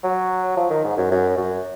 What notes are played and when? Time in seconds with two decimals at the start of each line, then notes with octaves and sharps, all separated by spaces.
0.03 F#3
0.57 F3
0.70 D#3
0.84 G#2
0.97 F#2
1.11 F#2
1.37 F#2